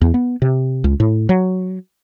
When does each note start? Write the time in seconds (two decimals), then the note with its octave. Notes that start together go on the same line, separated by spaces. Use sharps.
0.01 E2
0.14 B3
0.42 C3
0.84 C#2
1.00 A2
1.29 F#3